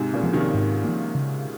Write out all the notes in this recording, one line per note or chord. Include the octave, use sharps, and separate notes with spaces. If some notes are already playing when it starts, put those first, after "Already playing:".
Already playing: G#2 C3
A#2 C#3
F3 A#3
C3 D#3
G#2
F3 A#3
C#3